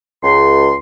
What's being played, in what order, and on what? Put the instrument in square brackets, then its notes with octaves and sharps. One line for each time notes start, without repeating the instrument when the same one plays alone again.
[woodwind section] C#2 C6